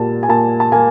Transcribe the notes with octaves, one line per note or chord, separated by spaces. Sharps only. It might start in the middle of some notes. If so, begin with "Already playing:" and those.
Already playing: A#2 G3 A5
G#5
A#2 A5
A5
A#3 G#5